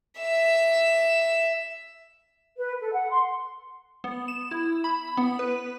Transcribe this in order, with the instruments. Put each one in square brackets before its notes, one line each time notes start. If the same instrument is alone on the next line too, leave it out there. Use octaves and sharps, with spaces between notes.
[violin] E5 E7
[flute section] B4
A4
F#5
C6
[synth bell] B3
E7
E4
B5
B3
B4